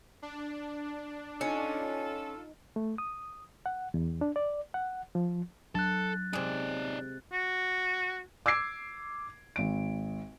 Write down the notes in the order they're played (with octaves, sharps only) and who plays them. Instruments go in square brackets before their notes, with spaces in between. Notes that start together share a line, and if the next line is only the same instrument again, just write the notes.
[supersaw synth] D4
[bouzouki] C#4 [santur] D#4 [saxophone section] F4 A4
[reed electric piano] A3
D#6
F#5
E2
D4
D5
F#5
F3
[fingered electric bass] F#3 D4 [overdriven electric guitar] A4 [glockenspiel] F#6 A6
[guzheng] C3 G#3 [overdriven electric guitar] D#4 D5
[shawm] F#4
[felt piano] D6 E6 G#6 C7 D7
G#1 D7